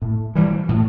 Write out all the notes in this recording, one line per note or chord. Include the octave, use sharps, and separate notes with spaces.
A2
E3 G3
A2